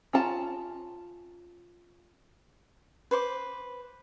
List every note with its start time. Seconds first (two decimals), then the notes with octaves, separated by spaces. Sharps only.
0.13 C#4 F4 A5 A#5
3.11 B4 C5 C#6 D6